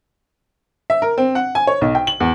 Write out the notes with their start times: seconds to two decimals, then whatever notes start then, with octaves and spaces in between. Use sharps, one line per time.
0.90 E5
1.02 A#4
1.18 C4
1.35 F#5
1.55 G#5
1.67 C#5
1.81 B1
1.95 G5
2.07 F#7
2.20 E2